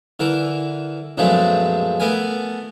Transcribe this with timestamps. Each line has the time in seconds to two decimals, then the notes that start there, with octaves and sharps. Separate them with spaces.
0.20 D3 E3 A#4
1.17 A#1 F#2 B2 F3 G#3 A3
2.00 A3 B3 A#4 G#5